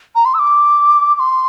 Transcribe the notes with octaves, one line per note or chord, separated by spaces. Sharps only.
A#5
C6
E6
D6
D6
C6